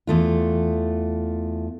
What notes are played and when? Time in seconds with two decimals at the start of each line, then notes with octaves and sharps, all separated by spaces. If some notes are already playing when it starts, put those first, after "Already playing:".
0.07 E2 A3 F4